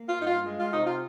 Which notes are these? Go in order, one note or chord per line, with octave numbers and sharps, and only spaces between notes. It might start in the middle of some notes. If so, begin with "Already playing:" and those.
Already playing: A#3
F4
G2 D#4
F4
G#3
F4
C3 D#4
F4